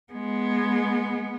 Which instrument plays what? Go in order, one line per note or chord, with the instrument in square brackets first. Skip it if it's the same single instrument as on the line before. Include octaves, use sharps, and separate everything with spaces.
[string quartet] G#3 [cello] B3